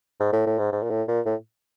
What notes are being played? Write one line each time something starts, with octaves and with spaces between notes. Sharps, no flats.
G#2
A2
A2
G#2
G#2
A#2
A2
A#2
A2